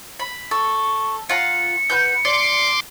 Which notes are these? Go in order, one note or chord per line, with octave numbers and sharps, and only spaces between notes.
B5
A4 C#6
F4 F#5 A#5 C#7
F#4 B4 G6
D5 C6 D6